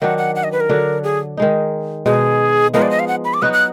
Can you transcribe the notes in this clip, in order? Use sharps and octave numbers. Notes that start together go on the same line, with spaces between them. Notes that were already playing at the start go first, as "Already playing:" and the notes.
D#3 F#3 D4 F#5
F#5
F#5
D#5
B4
A#4
D3 F#3 D4
G#4
D#3 G#3 D#4
B2 G#3 D#4 G#4
F3 G#3 B3 D#4 A#4
D5
D#5
F5
F#5
B5
D6
F#3 B3 D#4 F#4 F#6
F#6